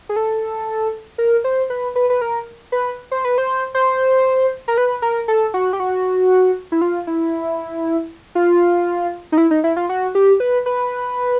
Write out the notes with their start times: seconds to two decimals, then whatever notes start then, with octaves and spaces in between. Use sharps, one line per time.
0.09 G#4
0.16 A4
1.18 A#4
1.44 C5
1.70 B4
1.96 B4
2.10 B4
2.21 A#4
2.72 B4
3.11 C5
3.25 B4
3.38 C5
3.75 C5
4.68 A#4
4.78 B4
5.02 A#4
5.28 A4
5.54 F#4
5.73 G4
5.80 F#4
6.72 E4
6.81 F4
7.07 E4
8.35 F4
9.32 D#4
9.38 E4
9.51 D#4
9.64 E4
9.77 F4
9.89 F#4
10.15 G4
10.40 B4
10.66 B4